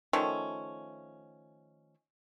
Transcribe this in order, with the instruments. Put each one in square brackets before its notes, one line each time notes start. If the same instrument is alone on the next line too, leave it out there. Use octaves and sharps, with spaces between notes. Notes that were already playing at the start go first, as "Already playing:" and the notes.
[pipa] D#3 F3 A3 C#4